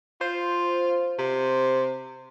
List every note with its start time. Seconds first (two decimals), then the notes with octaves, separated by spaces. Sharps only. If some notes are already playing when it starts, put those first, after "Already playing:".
0.21 F4 C5
1.19 C3